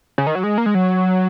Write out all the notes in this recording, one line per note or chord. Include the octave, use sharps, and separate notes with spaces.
C#3
D#3
F#3
G#3
A#3
G#3
F#3